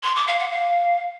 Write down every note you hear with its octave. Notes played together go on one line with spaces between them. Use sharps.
C6
D6
F5
F#5
F5